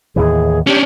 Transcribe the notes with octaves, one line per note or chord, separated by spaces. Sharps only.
D#2 A2 E3 G#4
C#4 D4 G4